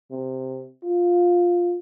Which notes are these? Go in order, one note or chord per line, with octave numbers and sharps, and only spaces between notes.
C3
F4